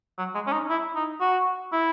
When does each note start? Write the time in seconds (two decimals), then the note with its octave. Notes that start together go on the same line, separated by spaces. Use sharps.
0.18 F#3
0.35 G#3
0.47 C#4
0.52 D#4
0.69 E4
0.95 D#4
1.21 F#4
1.72 E4